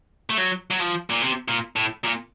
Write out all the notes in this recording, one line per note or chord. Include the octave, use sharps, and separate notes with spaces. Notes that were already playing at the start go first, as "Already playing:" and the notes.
A3
F#3
F#3
F3
A#2
C3
A#2
A2
A#2